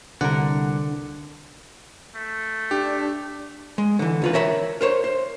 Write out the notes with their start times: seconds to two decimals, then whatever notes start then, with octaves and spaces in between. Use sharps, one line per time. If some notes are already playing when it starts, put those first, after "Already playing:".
0.21 C2 D3 A#4 F#5
2.16 A3
2.71 D4 G4
3.78 G#3
3.99 D3 E3
4.22 C#2 F4 B4
4.33 A#4 C#5 E5 F5 B5
4.81 A#4 C5 C#5
5.04 C5